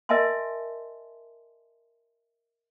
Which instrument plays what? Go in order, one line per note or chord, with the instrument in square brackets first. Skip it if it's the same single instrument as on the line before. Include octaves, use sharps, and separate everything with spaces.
[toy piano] A#4 D#5 E5 G#5 A5 C6